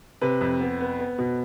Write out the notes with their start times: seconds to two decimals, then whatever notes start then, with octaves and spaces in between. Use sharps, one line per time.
0.21 C3 B4
0.41 F2
0.60 B3
0.80 B3
0.99 B3
1.18 B2